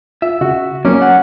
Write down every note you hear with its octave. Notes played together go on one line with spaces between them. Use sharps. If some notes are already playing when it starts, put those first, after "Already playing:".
F4 E5
C#3 F#4
F#3 A#3 C#4 D6
F#5